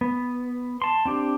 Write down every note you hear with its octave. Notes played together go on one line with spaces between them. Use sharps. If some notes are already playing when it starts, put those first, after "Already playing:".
B3
A5 C6
C4 D4 G4